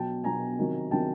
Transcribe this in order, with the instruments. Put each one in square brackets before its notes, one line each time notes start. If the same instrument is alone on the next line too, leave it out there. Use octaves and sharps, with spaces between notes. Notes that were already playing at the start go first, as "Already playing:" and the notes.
Already playing: [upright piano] B2 F#3 G5 A5
B2 F#3 G#5 A#5
C3 D#3 F#3
C3 D#3 F#3 G5 A5